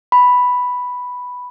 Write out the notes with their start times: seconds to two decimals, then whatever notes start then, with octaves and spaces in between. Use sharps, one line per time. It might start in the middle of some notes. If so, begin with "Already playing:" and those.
0.12 B5